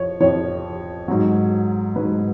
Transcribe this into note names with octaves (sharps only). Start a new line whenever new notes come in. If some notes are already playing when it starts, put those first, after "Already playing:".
Already playing: F2 F3 C#5
F2 F3 C#5
G#2 F#3
G#2 F#3 B4